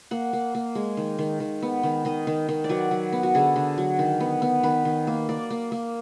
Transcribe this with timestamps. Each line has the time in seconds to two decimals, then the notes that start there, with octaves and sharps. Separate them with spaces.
0.11 A#3 F#5
0.33 A#3
0.55 A#3
0.75 G#3
0.97 D#3
1.19 D#3
1.40 D#3
1.62 B3
1.83 D#3
2.05 D#3 D#5
2.27 D#3
2.49 D#3
2.64 D5
2.69 F#3 B4
2.91 F#3
3.12 B3
3.23 F#4
3.35 D3 G#4
3.56 D3
3.78 F#3
3.99 D#3
4.20 B3
4.42 B3
4.63 D#3 B4
4.85 D#3
5.07 A#3
5.29 A#3 D5
5.51 A#3
5.72 A#3